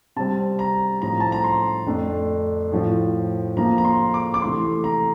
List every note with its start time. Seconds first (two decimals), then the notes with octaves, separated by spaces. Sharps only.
0.16 C3 G3 C4 A5
0.59 A#5
1.02 A2 F3 C4 A#5
1.20 A5
1.32 A#5
1.44 C6
1.87 F2 D3 A3 D4
2.72 A2 F3 C4
3.57 D3 F3 A#3 A#5
3.78 A#5
3.85 C6
4.14 D6
4.34 D6
4.42 C3 E3 A3 C6
4.84 A#5